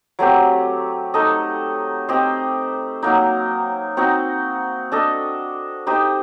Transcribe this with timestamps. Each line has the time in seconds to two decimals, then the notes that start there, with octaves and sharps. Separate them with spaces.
0.19 F#3 A3 C4 G4
1.14 A3 D#4 A4 D#5
2.08 C4 G4 C5 D#5
3.02 F#3 A#3 D#4
3.97 C4 D#4 F#4
4.92 D4 A4 D#5
5.87 D#4 G4 C5 D#5